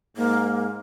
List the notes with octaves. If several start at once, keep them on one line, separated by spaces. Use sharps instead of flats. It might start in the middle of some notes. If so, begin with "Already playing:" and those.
G#2 A#3